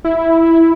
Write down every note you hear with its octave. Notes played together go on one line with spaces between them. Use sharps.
E4